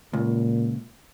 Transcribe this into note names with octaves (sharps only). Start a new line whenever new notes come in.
C#2 A#2